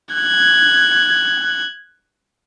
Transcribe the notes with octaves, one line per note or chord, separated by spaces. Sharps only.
F#6 G#6